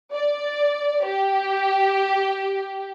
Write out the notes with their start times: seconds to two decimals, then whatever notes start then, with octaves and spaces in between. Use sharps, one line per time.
0.12 D5
1.05 G4